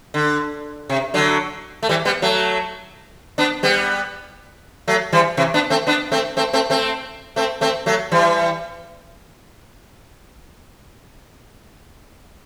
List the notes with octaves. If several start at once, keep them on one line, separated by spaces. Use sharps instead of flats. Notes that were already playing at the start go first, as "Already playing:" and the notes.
D3
C3
D3 F#3
A3
E3 G3
G3 B3
F#3 A3
B3 D4
G3 B3
F#3 A3
E3 G3
C3 E3
B3 D4
A3 C4
B3 D4
A3 C4
A3 C4
A3 C4
A3 C4
A3 C4
A3 C4
F#3 A3
E3 G3